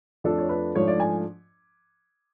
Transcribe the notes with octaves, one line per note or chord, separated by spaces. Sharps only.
F2 F3 A3 D4 A4
C#5
B4
G#2 F3 A3 D4 C#5
D5
G#5